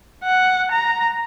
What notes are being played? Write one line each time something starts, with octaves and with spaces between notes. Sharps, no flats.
F#5
A#5